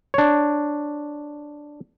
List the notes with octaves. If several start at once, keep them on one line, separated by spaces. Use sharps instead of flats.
D4 C#5